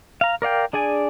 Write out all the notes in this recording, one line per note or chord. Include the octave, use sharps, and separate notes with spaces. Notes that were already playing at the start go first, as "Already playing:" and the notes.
F5 A#5
A#4 D5 F5 G5
D4 G#4 D5 G#5